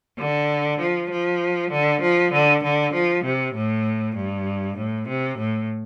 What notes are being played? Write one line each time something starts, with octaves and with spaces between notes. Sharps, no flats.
D3
F3
F3
D3
F3
D3
D3
F3
C3
A2
G2
A2
C3
A2